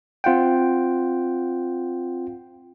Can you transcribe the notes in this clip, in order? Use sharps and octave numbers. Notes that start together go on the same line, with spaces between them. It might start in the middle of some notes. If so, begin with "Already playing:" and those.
C4 F4 F#5 G5